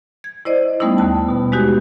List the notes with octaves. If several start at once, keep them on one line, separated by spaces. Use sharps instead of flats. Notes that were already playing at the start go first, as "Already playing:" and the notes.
G#6
E4 C5 D5 D#5
G3 A3 B3 C#4 D#4 E4
D#2 A5
B2 B3
G#3 D#4 F#4 G4